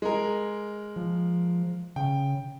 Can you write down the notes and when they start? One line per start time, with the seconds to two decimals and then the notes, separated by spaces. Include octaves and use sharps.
0.02 G#3 A#4
0.96 F3
1.96 C#3 G5